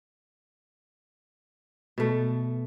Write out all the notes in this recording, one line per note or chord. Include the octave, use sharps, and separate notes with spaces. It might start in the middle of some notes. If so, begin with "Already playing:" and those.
B2 A3